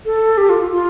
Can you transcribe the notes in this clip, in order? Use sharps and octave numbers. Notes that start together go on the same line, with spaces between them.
A4
G4
F4
F4
F4